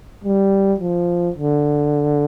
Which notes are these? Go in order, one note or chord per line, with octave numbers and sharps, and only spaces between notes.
G3
F3
D3